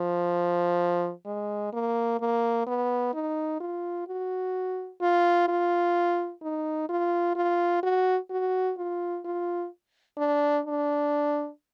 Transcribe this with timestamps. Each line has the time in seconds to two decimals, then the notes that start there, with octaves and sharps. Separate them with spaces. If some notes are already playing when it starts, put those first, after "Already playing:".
Already playing: F3
1.26 G#3
1.73 A#3
2.20 A#3
2.66 B3
3.13 D#4
3.60 F4
4.07 F#4
5.01 F4
5.48 F4
6.42 D#4
6.89 F4
7.36 F4
7.83 F#4
8.30 F#4
8.78 F4
9.25 F4
10.17 D4
10.65 D4